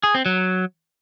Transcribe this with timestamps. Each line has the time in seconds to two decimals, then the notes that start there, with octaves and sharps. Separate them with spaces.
0.04 G#4
0.15 C4
0.26 F#3